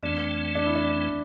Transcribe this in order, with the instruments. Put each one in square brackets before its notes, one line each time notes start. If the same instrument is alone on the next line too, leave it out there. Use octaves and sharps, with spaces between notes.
[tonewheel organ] F2 E3 A3 C4 [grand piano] D4
[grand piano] D4
E4
D4